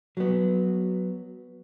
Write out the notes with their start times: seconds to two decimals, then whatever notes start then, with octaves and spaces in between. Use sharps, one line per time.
0.17 F#3 B3